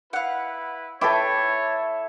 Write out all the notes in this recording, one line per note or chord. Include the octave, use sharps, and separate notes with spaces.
E4 B4 F5 F#5
E4 A4 B4 C#5 G5 D6